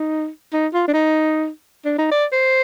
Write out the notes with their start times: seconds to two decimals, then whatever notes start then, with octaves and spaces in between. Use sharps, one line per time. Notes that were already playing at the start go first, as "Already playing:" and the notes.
Already playing: D#4
0.53 D#4
0.73 F4
0.88 D4
0.93 D#4
1.85 D4
1.99 D#4
2.11 D5
2.32 C5